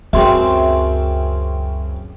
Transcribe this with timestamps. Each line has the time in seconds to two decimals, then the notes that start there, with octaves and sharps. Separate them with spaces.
0.13 C#2 F#2 C#3 C4 E5 C6